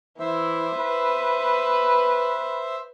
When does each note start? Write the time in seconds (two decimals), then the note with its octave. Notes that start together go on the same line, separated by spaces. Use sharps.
0.19 E3 C5 E5
0.79 B4